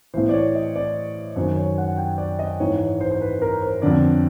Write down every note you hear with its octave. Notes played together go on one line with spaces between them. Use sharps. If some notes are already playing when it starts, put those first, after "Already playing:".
A2 E3 C5
D5
C#5
D#5
D5
F#2 D#3 C5
C#5
F#5
G5
D5
D#5
G#2 E3 C#5
C#5
C5
C5
B4
A#4
C5
F2 D3 D5